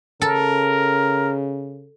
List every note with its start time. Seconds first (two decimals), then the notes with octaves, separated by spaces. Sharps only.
0.22 C#3 A4 A#4